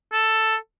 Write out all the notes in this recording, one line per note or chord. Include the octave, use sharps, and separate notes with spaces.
A4